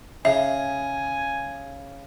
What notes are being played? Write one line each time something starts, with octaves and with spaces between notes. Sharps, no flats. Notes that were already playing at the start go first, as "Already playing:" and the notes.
C#3 E5 G#5